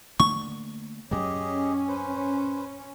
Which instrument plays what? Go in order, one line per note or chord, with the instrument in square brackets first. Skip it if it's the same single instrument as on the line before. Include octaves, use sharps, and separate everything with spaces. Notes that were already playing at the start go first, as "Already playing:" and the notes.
[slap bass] D3 A3 A#3 [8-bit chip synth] C#6
[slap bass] F#2 F#3 [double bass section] C#4 [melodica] G4 G#4 D#5
[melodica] B4 C5